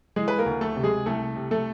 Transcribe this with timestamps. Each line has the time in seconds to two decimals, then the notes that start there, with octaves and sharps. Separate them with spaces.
0.16 E3 G#3 G#4
0.28 B4
0.38 A#3 A#4
0.46 D2
0.61 A3 A4
0.76 C3
0.83 G#3 G#4
1.06 C2 A3 A4
1.36 C3
1.51 A3 A4